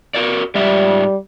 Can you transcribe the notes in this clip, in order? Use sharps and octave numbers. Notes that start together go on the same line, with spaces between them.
F#4 A#4 D5
G#2 G3 D5 E5